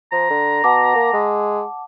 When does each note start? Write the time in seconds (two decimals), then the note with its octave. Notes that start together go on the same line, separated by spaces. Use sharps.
0.12 F3 A#5
0.30 D3
0.64 B2 F#5 A5 D6
0.95 A#3
1.13 G#3